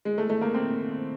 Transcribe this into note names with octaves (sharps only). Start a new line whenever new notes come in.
G#3
A3
A3
A#3
C4